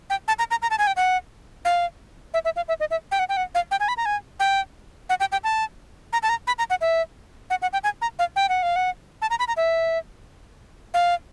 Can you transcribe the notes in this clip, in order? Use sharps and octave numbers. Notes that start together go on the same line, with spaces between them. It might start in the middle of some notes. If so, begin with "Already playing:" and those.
G5
A5
A#5
A#5
A#5
A5
G#5
G5
F#5
F5
E5
E5
F5
E5
D#5
E5
G5
F#5
G5
F#5
F5
G5
G#5
B5
A#5
G#5
G5
F#5
G5
G5
A5
A#5
A5
A#5
B5
A#5
F#5
E5
F#5
F#5
G5
G#5
A#5
F5
G5
F#5
F5
F#5
A5
A#5
B5
A#5
E5
F5